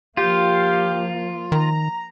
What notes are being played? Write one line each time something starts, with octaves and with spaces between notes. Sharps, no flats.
F3 A#3 F4 G4 F5
D#3 A#5